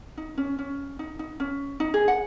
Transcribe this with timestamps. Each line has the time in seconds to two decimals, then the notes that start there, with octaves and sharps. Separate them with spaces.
0.17 D#4
0.38 C#4
0.59 C#4
0.99 D#4
1.19 D#4
1.40 C#4
1.80 D#4
1.94 G#4
2.08 F#5